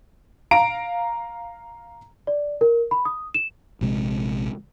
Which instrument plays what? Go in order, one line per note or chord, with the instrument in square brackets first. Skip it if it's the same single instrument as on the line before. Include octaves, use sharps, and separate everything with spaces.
[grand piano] F5 A#5 D7
[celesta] D5
A#4
B5
D#6
E7
[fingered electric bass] A#1 C3 G#3